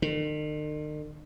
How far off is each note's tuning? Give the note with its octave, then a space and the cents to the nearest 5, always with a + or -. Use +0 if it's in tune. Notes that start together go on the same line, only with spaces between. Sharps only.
D#3 -45